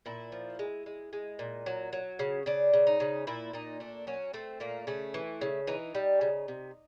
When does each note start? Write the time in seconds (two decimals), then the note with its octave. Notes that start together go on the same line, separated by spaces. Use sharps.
0.06 A#2 E4
0.32 F3
0.59 G#3
0.86 G#3
1.13 G#3
1.39 A#2
1.66 F#3
1.93 F#3
2.19 C#3
2.46 C#3 D4
2.73 C#3
2.87 D#4
3.00 C#3
3.27 A#2 E4
3.53 A#2 D#4
3.80 A3 D4
4.07 F#3 C#4
4.33 A3 C4
4.60 A#2 A#3
4.87 C#3 A3
5.14 E3
5.41 C#3
5.67 E3 D#4
5.95 G3
6.21 C#3
6.48 C3